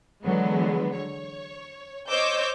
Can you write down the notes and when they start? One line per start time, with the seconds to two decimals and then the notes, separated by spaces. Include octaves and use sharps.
0.25 D3 E3 F#3 G#3 B3
0.95 C#5
2.09 C5 C#5 D#5 D6 E6 G6